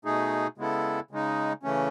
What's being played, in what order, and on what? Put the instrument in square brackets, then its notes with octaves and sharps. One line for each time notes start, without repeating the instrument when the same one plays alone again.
[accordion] B2 A3 D#4 G#4
C#3 G#3 B3 E4 A4
C#3 G#3 D#4
C#3 E3 A3 C#4